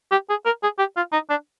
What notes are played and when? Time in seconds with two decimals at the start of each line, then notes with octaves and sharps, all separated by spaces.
0.11 G4
0.29 G#4
0.45 A#4
0.63 G#4
0.79 G4
0.96 F4
1.12 D#4
1.30 D4